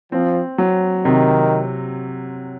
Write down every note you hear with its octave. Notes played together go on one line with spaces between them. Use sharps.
F3 C4
F#3
C3 D#3